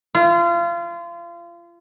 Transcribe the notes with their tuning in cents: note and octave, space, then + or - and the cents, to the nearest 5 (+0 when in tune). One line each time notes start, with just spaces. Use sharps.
F4 -30